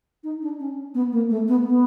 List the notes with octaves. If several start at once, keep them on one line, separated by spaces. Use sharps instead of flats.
D#4
D4
C#4
B3
A#3
A3
B3
B3